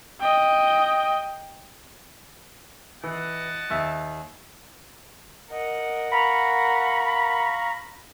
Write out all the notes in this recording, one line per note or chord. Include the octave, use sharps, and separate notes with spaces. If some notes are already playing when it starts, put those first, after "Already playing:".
D#5 G5
E3 D#5 F#5 A5
D#2 E5
A#4 D#5 F#5
F5 A#5 B5 C#6